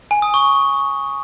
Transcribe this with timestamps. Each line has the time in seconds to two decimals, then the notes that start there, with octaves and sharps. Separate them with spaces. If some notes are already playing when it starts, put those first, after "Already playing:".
0.11 G#5
0.22 D#6
0.34 C#6